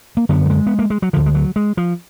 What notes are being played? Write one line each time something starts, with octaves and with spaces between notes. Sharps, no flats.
A#3
F#2 D3 B3
F#3
G#3
B3
A#3
G#3
F#3
D2 D3 F3
G#3
F#3
G#3
F3